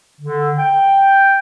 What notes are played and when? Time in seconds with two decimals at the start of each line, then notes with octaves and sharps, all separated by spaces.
0.21 D3
0.57 G5